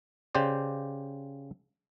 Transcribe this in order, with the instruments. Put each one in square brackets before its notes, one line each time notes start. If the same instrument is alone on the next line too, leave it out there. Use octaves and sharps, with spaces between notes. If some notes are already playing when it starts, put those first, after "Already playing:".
[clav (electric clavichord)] C#3 G4 C5 D5